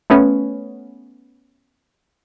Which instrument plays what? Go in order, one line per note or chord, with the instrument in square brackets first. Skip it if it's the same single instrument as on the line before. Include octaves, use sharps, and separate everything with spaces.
[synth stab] A3 B3 C#4